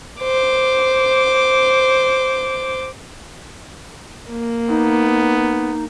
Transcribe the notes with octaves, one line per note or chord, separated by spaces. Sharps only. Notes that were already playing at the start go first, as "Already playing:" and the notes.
C5 D6
A#3
B3 D#4